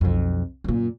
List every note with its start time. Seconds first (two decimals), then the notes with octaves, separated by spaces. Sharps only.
0.01 B1 F2
0.64 F#2 A#2